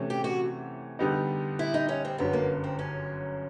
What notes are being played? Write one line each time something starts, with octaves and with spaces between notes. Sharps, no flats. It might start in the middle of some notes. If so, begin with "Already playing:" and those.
Already playing: C3 E3 A3 C#4
G4
F#4
D3 G3 B3 D#4
E4
D#4
C#4
C4
G1 F#2 D3 F#3 B3
A#3
C4
C#4